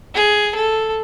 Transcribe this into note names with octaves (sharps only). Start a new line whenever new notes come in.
G#4
A4